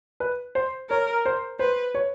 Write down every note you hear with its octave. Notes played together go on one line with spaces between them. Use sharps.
B4
C5
A#4 C#5
C5
B4 C5
C#5